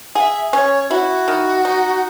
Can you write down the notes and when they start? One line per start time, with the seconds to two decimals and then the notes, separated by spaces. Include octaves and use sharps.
0.15 G#4 F#5
0.20 E5
0.53 C#4 C#5
0.90 E4 F#4
1.28 D#3
1.65 D#4